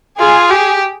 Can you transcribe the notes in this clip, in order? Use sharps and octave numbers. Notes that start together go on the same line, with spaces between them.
F4 G#4
G4